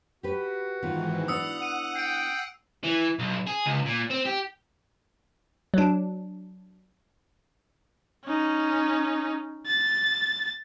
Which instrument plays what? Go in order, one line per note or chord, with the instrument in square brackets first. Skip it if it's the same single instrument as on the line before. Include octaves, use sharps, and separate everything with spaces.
[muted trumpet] F#4 [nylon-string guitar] G4 B4
[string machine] G#2 E3 [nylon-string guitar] D#3 B3 F4
[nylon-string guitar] B3 D4 E4 [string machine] F#5 [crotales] D#6 E6 C#7
[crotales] D#7
[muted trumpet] G5 [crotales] C7 D7
[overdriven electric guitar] E3
B1
G#4
C#2
A#2
C4
G4
[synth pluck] F#3 D4
[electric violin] C#4 D#4
A6